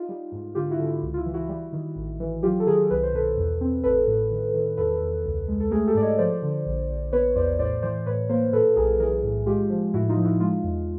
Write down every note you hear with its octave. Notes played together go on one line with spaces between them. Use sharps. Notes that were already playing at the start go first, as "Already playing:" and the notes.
Already playing: D#4 F4
G3
G#2
D3 F4 G4
E4 F#4
D3
E4
C#2
F4
E4
E3
E4 F#4
G3
D#3
A1
E3
F#3 F4 G4
A4
D#3 G#4 A#4
C2 B4
C5
B2 A4 B4
E2
C4
A1 A4 B4
A2
D#3
D#3
E2 A4 B4
E2
C#2
G#3
A4
A3 G#4 A#4
G4 A4
G#2 D5
C#5 D#5
F3 C5 D5
D3
A#1
A#1
B3 B4 C#5
E2 C5 D5
A2 C5 D5
E3 C5 D5
A2 B4 C#5
A#3 A#4 C5
A#2 A4 B4
B1 G#4 A#4
E3 G#4 A#4
A2
G#3 F4 G4
F3
A2 E4 F#4
D#4 F4
F3
E4 F#4
G#3 D#4 F4
E2